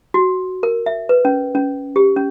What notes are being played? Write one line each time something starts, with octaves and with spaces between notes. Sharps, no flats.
F#4
A#4
E5
B4
C#4
C#4
G4
C#4